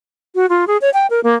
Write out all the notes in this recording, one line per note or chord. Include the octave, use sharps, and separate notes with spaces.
F#4
F4
G#4
C#5
G5
A#4
A#3